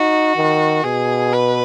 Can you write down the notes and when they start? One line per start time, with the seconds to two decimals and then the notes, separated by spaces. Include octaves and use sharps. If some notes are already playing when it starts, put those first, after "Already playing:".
Already playing: D#4 F#4
0.36 D#3
0.84 B2 G#4
1.33 B4